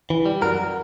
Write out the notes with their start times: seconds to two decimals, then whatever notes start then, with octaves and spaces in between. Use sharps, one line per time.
0.10 E3
0.26 G3
0.42 F#2 F#4 A#4